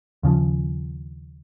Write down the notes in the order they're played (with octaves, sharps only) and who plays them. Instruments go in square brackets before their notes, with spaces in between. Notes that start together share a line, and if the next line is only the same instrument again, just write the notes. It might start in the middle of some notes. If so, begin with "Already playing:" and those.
[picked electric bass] D#2 C#3 F3